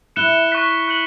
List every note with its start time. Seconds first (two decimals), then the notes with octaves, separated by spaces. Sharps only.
0.16 E4 F#6 C#7 E7 G7
0.52 C#6 F#6 B6
0.88 F#6 C#7 F#7